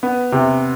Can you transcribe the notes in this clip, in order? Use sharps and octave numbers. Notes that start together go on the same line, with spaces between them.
B3
C3